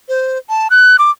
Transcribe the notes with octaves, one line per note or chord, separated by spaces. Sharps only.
C5
A5
F#6
D6